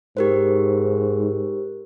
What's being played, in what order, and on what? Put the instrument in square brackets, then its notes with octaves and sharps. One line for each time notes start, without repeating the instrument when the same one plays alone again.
[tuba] G#2 [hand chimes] G4 A#4 C5